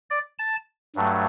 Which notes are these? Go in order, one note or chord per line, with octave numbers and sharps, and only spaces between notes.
D5
A5
G2 F#3 A3